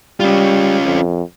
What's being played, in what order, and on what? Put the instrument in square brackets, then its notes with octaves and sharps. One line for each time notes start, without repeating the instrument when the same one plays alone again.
[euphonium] G3 [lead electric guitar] C#4 F4
[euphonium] F2